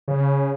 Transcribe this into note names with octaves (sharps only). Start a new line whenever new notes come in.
C#3